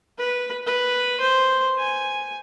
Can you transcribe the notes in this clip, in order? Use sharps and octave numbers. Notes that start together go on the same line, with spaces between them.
B4
B4
C5
G#5